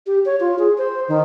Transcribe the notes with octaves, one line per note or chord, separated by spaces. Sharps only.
G4
C#5
F4
G#4
C5
D#3